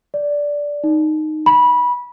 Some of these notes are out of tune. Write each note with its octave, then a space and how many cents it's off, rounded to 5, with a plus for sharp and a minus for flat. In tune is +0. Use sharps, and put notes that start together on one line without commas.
D5 -10
D#4 -10
B5 -20